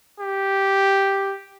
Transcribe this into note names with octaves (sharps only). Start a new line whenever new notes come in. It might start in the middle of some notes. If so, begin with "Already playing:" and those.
G4